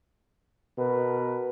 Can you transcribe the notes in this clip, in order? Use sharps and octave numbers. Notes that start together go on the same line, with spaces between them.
B2 A#4 B4